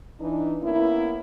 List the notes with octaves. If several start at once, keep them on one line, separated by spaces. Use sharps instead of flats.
E3 D4 D#4
A#3 B3 C#4 E4